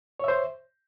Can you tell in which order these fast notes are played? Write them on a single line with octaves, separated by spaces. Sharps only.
C#5 E5 C5